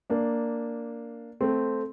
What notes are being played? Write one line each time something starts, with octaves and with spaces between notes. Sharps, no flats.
A#3 D4
A3 C4